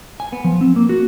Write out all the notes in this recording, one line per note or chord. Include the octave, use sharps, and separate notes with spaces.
G#5
B3
F3
C4
A#3
F#4